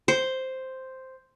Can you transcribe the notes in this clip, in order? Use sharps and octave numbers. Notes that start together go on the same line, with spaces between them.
C5